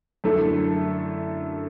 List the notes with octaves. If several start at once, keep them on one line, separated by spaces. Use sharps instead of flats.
F#2 D3 A3 E4 A4